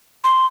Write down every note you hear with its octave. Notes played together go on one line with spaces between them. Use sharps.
C6